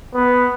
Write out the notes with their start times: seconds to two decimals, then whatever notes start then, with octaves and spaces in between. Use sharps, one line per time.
0.15 B3